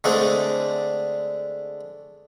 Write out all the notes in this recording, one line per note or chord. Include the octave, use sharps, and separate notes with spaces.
D3 G#3 A3 C4 D4